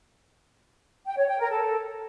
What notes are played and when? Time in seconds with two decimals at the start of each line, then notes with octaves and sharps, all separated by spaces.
1.06 G5
1.17 C#5
1.28 G5
1.39 A#4
1.51 A4